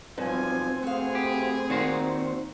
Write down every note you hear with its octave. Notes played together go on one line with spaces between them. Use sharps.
B1 G2 F3 C4 G#5
A3 B3 F#4 G#4 F5
G4
A#2 D#3 F#4 C5